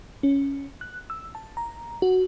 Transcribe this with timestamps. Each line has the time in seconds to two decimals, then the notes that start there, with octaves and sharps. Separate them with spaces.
0.23 C#4
0.81 F#6
1.10 E6
1.35 A5
1.57 A#5
2.02 F#4